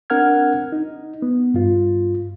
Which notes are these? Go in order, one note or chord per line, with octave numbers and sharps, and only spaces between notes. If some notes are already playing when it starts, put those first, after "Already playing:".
C4 D4 A#4 F#5 F6 G#6
D#4
B3
G2 F4